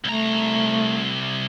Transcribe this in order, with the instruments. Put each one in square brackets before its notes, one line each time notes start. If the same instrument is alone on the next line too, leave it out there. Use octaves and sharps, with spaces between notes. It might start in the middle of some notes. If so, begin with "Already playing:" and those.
[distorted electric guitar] C2 A#5 [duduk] A3